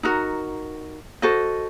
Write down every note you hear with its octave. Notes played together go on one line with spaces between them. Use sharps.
D#4 F#4 A#4
F#4 A4 C5 D#5